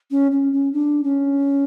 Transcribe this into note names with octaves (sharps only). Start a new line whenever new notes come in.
C#4
C#4
C#4
D4
C#4